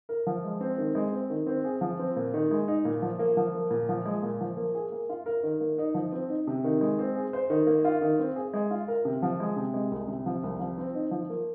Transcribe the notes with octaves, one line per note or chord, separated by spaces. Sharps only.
A#4
F3
G#3
C4
D#3
G#3
C4
D#3
C4
G#4
F3
C4
A#2
D#3
G#3
D#4
A#2
F3
A#3
F3
A#3
A#2
F3
G#3
A#2
F3
A#3
G#4
A#3
F4
A#4
D#3
A#3
D#4
F3
C4
D#4
C3
D#3
G#3
C4
G#4
C5
D#3
A#3
F4
D#3
C4
G#4
G#3
F4
A#4
C3
F3
G#3
C3
G#3
C2
C3
F3
C2
F3
C4
D#4
F3
A#3